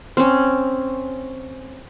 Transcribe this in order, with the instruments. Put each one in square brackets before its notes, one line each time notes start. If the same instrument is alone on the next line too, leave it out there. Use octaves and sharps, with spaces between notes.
[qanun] C4 C#4